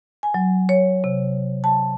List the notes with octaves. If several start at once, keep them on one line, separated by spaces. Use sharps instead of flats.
G#5
F#3
C#5
C3
A5